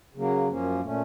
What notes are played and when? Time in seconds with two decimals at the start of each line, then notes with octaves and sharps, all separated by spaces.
0.14 C#3 F#3 A#3
0.47 F#2 F3 A#3 C#4
0.81 A#2 A3 C#4